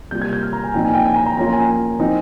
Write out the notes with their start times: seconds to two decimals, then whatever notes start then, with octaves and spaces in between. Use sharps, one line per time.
0.11 C3 G3 A#3 F4 G6
0.22 G#6
0.33 G6
0.43 F6
0.53 A#5
0.64 G#5
0.74 A#2 F3 C4 D#4 G5
0.85 G#5
0.95 G5
1.05 G#5
1.16 A#5
1.26 A#5
1.37 F3 A#3 C#4 F4 A#5
1.53 G#5
1.99 F3 C4 D#4